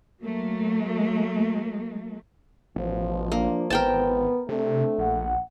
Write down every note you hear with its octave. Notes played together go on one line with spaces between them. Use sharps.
F#3 A3 A#3
A1 B2 F3
A#3 D4
G#1 E3 B3 A#4 C5 G5 A5
C3 A3 C4 D4
A#1 F#5